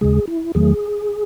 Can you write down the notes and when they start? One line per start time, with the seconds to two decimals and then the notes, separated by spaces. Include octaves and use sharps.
0.01 D#2 C#3 G#3 G#4
0.28 E4
0.55 E2 D#3 F#3 A3 G#4